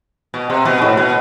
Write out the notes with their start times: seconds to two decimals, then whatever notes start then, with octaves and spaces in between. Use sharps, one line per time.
0.34 B2
0.50 C3
0.65 B2
0.82 A2
0.97 B2